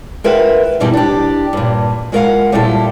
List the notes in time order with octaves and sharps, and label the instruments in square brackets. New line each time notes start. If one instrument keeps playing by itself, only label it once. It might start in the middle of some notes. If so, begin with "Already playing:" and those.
[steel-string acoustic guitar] F4 A#4 B4 E5 F#5 G5
G2 B2 E3 G3 D#4
D4 G4
G2 A#2
G#3 F4 A#4 C#5 F5 F#5
A#2 G3 E4 F4 A4